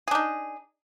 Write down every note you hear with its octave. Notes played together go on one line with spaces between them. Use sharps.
D4 D#4 G#4